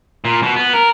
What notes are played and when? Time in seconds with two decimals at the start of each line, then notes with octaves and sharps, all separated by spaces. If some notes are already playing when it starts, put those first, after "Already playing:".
0.25 A#2
0.42 B2
0.56 B3
0.73 A#4